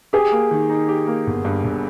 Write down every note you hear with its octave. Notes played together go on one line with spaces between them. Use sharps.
G4 G#4
A#3
D#3
D#4
G4
A#3
G1
G2
G1